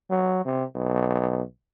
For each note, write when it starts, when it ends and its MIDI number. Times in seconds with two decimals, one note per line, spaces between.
0.11 0.45 54
0.45 0.64 48
0.75 1.42 35